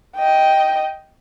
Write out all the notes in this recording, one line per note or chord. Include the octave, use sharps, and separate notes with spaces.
D#5 G5